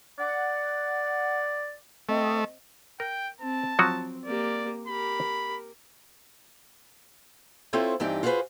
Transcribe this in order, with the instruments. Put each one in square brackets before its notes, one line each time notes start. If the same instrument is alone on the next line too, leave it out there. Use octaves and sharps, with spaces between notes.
[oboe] D5 [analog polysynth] F#5
[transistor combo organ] A3 [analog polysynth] C4 D#5
[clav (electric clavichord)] A#4 [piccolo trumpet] G5
[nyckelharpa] C4 [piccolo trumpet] A5
[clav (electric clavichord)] F3 F#3 F#4 [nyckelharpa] C4
[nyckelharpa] A#3 G4 [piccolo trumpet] D5
[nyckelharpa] G4 A#4 [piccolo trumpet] B5
[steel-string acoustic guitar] C4 E4 F4 A4 C5 C#5
G2 E3 C4 D#4 G4
F4 F#4 G#4 A4 B4 C5